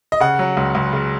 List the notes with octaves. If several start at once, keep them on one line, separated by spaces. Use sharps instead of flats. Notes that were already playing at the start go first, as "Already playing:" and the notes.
D#5
C#3 F#5
F#3
C#2
C#2
C#3